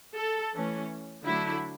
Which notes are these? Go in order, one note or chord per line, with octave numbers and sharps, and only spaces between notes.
A4
E3 A3 C#4
D3 F#3 A3 D4 E4